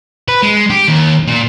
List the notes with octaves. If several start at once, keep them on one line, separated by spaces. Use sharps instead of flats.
B4
G#3
G4
D#2
A#2